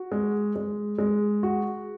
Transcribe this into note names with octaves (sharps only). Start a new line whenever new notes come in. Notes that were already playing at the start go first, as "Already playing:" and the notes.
Already playing: F#4
G#3
G#3
G#3
F#4